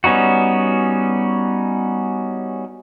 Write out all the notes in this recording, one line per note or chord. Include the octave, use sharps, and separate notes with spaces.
G3 B3 C#4 D#4 F#4